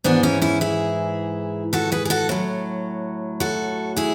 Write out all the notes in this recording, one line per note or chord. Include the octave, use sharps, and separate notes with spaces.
G#2 E3 B3 D4
C#4 E4
C#4 E4
E4 G#4
F#4 A4
G#4 B4
G#4
F#4 A4
A2 F#3
F#4 A4
E4 G#4